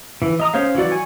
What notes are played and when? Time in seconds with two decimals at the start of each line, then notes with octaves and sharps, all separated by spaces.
0.22 E3
0.40 D#5 A#5 D#6
0.54 C#4 C5 C#5 F5
0.75 E3 F#3 F#4 D5
0.92 G#5 C#6